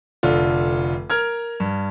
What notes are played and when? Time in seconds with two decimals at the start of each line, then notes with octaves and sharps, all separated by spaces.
0.23 F1 D3 F4
1.10 A#4 F6 G#6
1.60 G2